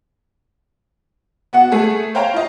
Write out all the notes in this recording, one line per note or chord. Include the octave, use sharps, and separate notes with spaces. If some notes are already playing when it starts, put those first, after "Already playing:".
B3 F#4 F#5
A3 G#4 A4
C5 C#5 F5 G5 A#5
F4 D#5